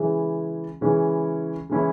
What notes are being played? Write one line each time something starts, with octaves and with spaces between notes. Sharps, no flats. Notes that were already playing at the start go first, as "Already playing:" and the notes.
Already playing: C#3 E3 G#3 C#4 E4
C#3 E3 G#3 C#4 E4
C#3 E3 G#3 C#4 E4